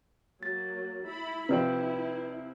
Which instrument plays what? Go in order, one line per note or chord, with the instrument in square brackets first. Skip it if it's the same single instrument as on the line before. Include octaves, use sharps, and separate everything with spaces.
[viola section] F#3 A#3 [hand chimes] A6
[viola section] E4 B5
[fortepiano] C3 F3 C4 [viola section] E4 [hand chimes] B4 D5